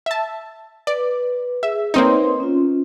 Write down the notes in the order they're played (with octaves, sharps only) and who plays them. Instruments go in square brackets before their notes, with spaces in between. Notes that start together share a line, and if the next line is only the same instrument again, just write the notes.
[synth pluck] E5 A5
[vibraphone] B4 [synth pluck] D5
[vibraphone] G#4 [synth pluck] E5
[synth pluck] A#3 C4 D#4 [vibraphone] B4 C#5 C6
[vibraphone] C#4 F4